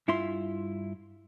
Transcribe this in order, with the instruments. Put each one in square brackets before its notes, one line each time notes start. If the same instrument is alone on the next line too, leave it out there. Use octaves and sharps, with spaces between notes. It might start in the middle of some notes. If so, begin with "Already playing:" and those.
[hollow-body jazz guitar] G2 E4 F4 E5 C6